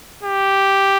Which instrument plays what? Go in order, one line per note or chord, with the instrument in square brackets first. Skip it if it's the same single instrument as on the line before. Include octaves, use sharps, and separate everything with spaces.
[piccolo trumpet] G4